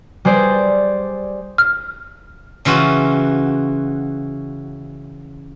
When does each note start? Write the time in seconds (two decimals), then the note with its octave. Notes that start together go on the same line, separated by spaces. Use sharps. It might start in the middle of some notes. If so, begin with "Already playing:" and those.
0.25 G3 G#4 C5 D5
1.58 F6
2.65 C#3 E3 F4 F#4